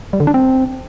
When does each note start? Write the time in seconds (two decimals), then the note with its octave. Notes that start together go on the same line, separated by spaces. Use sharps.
0.13 G3
0.20 D3
0.27 D4
0.34 C4